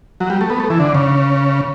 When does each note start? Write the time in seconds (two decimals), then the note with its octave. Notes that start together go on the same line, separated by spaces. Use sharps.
0.20 F#3
0.30 G3
0.41 A3
0.50 B3
0.60 A3
0.70 E3
0.80 D3
0.95 C#3